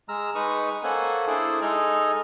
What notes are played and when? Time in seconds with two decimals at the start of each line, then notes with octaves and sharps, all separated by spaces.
0.09 G#3 A#5 E6 F6
0.35 G#3 D#4 B4 C#6 D#6
0.84 A#3 C#4 A4 C5 F#5 G#5
1.27 D4 E4 G#4 A4 C5 D5
1.62 G#3 D#4 A4 D#5 G#5 F6